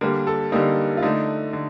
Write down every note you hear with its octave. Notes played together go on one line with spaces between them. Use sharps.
D3 G3 A#3 A#4
A4
D3 G3 A#3 D#4
F4
D3 A3 D#4
D3